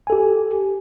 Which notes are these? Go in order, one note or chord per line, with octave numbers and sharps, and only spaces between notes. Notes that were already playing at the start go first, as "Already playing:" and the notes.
G4 A4 G#5